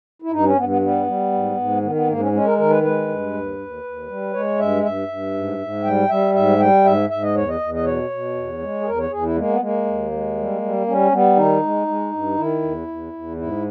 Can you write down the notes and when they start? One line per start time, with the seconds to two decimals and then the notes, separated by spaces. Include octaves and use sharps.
0.22 E4
0.31 G2 D#4
0.44 C#4
0.56 G2 B3
0.69 B3
0.81 G3 B3
1.07 G3
1.32 G#2
1.57 G#2
1.82 D#3 B3
1.95 B3
2.07 G#2 A#3
2.20 C#4
2.32 G#3 C#4
2.45 A#4
2.58 D#3 A#4
2.70 B4
2.83 G#3 B4
3.08 G2
3.33 D#2
3.59 D#2
3.84 D#2
4.09 G3
4.33 G#3 C#5
4.58 G2 E5
4.83 G2 E5
5.08 G2
5.34 G#2
5.58 G#2
5.84 G3 G5
6.09 G3 E5
6.34 G#2 E5
6.59 G3 G5
6.85 G#2 E5
7.10 G#2 E5
7.22 D#5
7.35 E2 C#5
7.49 D#5
7.60 E2
7.74 D#5
7.85 B2 C#5
8.10 B2
8.35 E2
8.60 G#3
8.81 G#4
8.85 E2 A#4
8.98 C#5
9.11 E2 G#4
9.23 E4
9.36 G#3 A#3
9.49 B3
9.60 G#3 A#3
9.85 D#2
10.12 G#3
10.37 G3
10.62 G3
10.87 G3 C#4
11.11 G3 B3
11.36 D#3 D#4
11.62 G#3
11.87 G#3
12.12 G2
12.37 D#3 E4
12.62 E2
12.87 E2
13.13 E2
13.37 G#2 E4